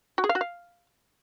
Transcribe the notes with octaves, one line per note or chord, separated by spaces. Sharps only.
F#4
G#4
F5
F#4
F5